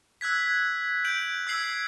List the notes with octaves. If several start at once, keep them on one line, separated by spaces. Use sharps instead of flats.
E6 F#6 G#6 B6
G6 D7 F#7
E6 G#6 C7 F#7